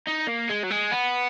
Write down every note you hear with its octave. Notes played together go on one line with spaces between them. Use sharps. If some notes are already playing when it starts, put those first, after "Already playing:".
D#4
A#3
G#3
F#3
G#3
B3